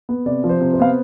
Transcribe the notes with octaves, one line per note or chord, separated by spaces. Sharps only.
B3
C3 D5
F3
C5
C3
C5
B3 F5